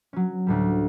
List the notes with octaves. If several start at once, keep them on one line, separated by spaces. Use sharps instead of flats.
F#3 C#4
D2 A2 G3